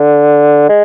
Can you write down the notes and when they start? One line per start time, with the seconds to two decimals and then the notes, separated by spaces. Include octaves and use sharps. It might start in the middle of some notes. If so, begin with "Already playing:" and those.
Already playing: D3
0.69 G#3